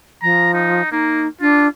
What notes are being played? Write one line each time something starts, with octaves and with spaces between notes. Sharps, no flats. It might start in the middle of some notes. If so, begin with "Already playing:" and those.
F3 A#5
D#4
A#3 D#4
D4 F4